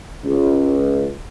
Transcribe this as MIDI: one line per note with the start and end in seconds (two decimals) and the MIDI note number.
0.25 1.09 37